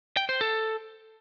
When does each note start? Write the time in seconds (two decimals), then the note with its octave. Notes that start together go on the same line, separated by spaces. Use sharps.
0.17 G5
0.29 C5
0.41 A4